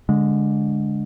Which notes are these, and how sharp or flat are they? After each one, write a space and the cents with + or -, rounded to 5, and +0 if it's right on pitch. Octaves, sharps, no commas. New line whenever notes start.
D3 -15 G#3 +0